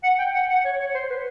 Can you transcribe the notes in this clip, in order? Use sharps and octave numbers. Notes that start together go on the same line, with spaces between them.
F#5
G5
F#5
F#5
C#5
C#5
C5
B4